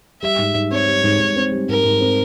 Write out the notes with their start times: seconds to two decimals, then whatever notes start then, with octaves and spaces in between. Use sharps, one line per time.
0.22 G3 E5
0.38 G#2
0.54 G#2
0.71 C4 C#5
0.87 G3
1.04 G#2
1.20 G#2
1.36 C4
1.52 G3
1.69 G#2 A#4
1.85 G#2
2.01 C4